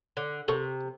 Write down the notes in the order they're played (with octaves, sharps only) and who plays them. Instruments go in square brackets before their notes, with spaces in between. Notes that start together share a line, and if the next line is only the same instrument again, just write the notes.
[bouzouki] D3
[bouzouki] C3 [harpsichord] A4 A#4 C#6